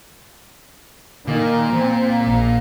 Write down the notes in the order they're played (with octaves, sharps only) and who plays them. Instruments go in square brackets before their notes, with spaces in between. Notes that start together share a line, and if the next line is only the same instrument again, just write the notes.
[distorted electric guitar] A#2 [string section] D#3
[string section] C4
A#1